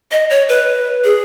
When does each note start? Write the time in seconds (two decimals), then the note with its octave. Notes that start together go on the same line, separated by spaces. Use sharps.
0.12 D#5
0.30 C#5
0.49 B4
1.04 G#4